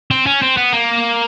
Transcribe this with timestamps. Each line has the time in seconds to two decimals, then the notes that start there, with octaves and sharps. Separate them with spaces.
0.11 C4
0.26 C#4
0.42 C4
0.57 B3
0.73 A#3